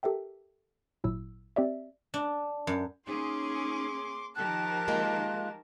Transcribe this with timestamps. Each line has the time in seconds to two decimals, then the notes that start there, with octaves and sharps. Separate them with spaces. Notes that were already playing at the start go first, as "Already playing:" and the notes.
0.03 G4 A4 A#4 E5 G5
1.04 G#1 A#2 F#3 E4 E6
1.56 C4 G4 D5 E5
2.14 D4
2.67 F#2
3.07 A#3 C#4 D#4 G#4 C6 D6
4.35 D#3 F3 G4 A#4 A5 F#6
4.88 G#3 A#3 F4